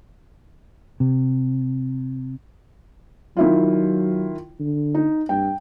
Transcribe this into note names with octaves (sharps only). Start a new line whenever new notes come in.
C3
D#3 F#3 E4 F4
D3
D#4
G2 G5